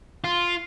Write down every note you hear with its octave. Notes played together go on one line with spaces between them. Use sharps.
F4